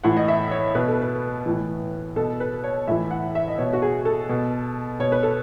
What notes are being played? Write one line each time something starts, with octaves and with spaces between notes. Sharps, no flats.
A2 E3 F#5
D#5
E5
C#5
B2 B4
A4
B4
A2 E3
B2 A4
B4
C#5
A2 E3 E5
F#5
E5
D#5
B2 C#5
F#4
G#4
A4
B2
B2 C#5
B4
A4